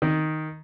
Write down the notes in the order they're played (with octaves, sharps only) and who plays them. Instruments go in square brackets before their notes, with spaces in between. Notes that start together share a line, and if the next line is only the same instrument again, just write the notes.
[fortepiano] D#3